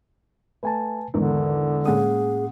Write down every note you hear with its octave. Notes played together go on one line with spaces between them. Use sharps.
A3 B4 G#5 A5
G#1 E2 G#2 D3 D4 A#4
A2 G#3 A#3 C#4 G#4 F#5 D#6